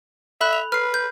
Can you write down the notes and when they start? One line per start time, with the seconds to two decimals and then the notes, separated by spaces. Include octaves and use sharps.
0.41 A4 E5 B5 F#6
0.53 F7
0.72 B4 F6 C7
0.94 G6